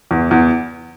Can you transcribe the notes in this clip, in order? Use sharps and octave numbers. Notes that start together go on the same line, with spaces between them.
E2
E2